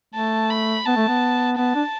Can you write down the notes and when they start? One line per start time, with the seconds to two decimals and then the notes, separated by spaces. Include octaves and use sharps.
0.15 A3 A5
0.51 B5
0.86 B3 A5
0.96 A3
1.08 B3
1.57 B3 A5
1.75 D4